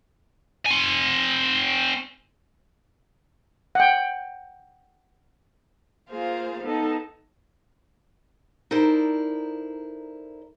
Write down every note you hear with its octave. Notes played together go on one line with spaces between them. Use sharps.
C4 G#5
F#5 G5
A#3 F4 G#4 C5 F5
B3 D#4 A4
D#4 E4 A4 A#4 C5 D5